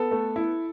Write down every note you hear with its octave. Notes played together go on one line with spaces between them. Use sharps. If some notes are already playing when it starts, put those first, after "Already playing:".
Already playing: B3 A4
A3
E4